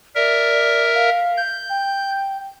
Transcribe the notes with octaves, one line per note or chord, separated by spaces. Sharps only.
A#4 D5 E5
F5
G6
G5